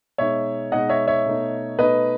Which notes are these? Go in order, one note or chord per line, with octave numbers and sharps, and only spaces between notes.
B2 G#3 D#4 C#5 E5
B2 G#3 D#4 D#5 F#5
C#5 E5
C#5 E5
B2 A3 D#4
B2 A3 D#4 B4 D#5